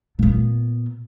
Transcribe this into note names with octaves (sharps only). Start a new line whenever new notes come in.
A#2 B3